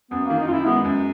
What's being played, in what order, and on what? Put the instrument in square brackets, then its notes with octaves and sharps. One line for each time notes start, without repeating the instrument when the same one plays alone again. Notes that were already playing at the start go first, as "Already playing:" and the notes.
[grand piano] F#2 [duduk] B3
[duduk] A#3
[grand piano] D#3
[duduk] D#4
[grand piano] F#2 [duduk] E4 F4
[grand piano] G#3 [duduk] B3
[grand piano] F#2